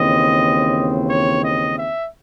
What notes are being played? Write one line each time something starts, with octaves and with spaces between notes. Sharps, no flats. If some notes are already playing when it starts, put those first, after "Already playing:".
Already playing: D#2 C#3 E3 C4 D#5
C#5
D#5
E5